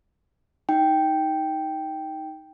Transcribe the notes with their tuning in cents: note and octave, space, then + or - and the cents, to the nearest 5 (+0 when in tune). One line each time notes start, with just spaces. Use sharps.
D#4 +15 G5 +0